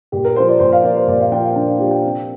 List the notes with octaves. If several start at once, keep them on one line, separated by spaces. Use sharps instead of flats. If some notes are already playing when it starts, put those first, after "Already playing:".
A#2 G4
A#4
F3 A#3 C5
D5
A#2 C5
F5
F3 A#3 D5
C5
A#2 D5
F5
F3 A#3 G5
F5
A#2 D4
F4
F3 A#3 G4
G5
C3